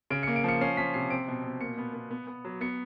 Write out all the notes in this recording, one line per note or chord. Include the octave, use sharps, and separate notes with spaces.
C#3 D7
C#7
A#3
D7
F3 C#7
C#4 C7
F3 B6
C3 C7
C4 D7
B2
B2
A#2 C#7
B3
B3
B3
B3
F#3
B3 C#7